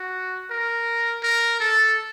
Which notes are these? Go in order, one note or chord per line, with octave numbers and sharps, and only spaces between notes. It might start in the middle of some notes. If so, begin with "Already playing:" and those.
Already playing: F#4
A#4
A#4
A4